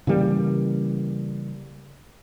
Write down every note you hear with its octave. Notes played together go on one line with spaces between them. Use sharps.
C#3 E3 G3 A#3